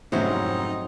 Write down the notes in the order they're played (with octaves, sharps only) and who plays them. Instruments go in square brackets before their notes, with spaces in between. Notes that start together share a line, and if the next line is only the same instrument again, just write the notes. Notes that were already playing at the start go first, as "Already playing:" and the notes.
[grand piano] F1 G#2 E4 [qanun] F#3 C4 [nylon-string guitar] C#4 C5 [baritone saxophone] D#4